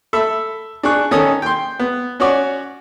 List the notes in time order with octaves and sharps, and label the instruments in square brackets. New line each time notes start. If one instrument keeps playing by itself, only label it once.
[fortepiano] A4 E5 B5
D4 G#4 C#6 F#6
D#3 C#4 A4 D#6
G5 C6
B3
C#4 F#4 C#5 D5